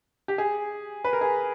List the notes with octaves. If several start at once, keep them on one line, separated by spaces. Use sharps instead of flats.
G4
G#4
B4
A#4
G#4